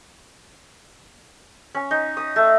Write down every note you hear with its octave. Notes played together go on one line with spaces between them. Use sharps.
C#4
D#4
D#6
A3